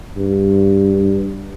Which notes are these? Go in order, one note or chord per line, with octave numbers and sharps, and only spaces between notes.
G2